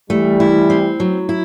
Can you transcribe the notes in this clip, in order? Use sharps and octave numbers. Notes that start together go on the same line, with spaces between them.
E3 G3 A3
E4
C4
F#3
E4